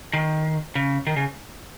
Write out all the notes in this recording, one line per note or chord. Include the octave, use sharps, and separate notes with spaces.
D#3
C#3
D#3
C#3